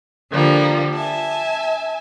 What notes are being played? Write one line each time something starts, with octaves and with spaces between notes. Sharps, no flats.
D3 F3 G3 A#3
E5 G#5 A5